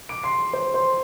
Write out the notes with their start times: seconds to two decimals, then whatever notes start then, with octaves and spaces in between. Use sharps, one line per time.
0.09 D6 D7
0.23 C6 C7
0.53 C5 C6
0.74 C5 C6